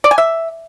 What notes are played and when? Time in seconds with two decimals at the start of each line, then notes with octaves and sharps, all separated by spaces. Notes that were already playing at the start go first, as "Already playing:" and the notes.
0.04 D5
0.11 G#5
0.18 E5